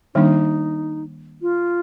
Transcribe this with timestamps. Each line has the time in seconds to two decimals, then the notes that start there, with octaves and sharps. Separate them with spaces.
0.15 D#3 G3 A#3 D4 D#4
1.42 F4